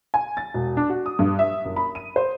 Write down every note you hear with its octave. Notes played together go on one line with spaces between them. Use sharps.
G#5
A6
E1
D4
F#4
D#6
G2
E5
F#1
B5
D#7
C5